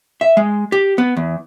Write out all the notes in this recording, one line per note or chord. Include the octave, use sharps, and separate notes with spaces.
E5
G#3
G4
B3
E2